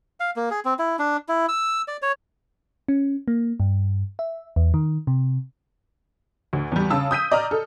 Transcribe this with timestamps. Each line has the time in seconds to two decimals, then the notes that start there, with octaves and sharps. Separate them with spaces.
0.20 F5
0.36 A#3
0.50 G#4
0.65 C4
0.79 E4
0.99 D4
1.28 E4
1.49 E6
1.88 D5
2.02 C#5
2.88 C#4
3.28 A#3
3.60 G2
4.19 E5
4.56 E2
4.74 D#3
5.07 C3
6.53 D2
6.72 E2 G3
6.90 C#3 A5 E6
7.11 D#6 G6 B6 D#7
7.32 D5 D#5 A#5 F6
7.51 A4